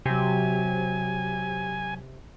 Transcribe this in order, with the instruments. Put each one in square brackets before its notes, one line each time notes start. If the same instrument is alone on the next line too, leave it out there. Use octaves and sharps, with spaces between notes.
[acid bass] C3 [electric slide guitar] F#3 G4 [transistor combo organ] G#5